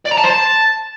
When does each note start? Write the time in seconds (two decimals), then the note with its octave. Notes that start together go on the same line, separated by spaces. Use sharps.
0.06 D5
0.12 A#5
0.18 A5
0.24 C5
0.30 A5